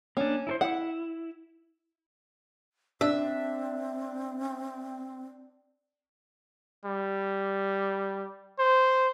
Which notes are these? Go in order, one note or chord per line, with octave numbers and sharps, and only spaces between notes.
A#3 C#4 D4
E4 A4 C5
E4 F#5
C4 D4 E5
G3
C5